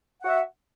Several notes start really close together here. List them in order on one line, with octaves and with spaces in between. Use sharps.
F#5 F#4 E5